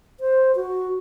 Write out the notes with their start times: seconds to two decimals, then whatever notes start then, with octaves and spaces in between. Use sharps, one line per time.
0.20 C5
0.56 F#4